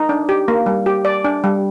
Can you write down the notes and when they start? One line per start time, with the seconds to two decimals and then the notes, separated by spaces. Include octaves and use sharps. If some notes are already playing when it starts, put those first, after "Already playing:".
Already playing: D#4
0.09 D4
0.29 G4
0.48 A#3
0.66 G3
0.86 G4
1.05 D5
1.24 D4
1.44 G3